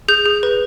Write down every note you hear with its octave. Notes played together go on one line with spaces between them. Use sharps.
G#4 G6
G#4
B4